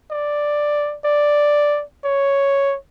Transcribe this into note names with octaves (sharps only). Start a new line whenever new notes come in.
D5
D5
C#5